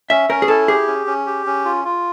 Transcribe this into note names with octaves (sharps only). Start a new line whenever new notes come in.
C#4 E5
C#4 A#4
G#4
E4 A4
G4 G#4
C#4
C#4
G4
C#4
F4
F4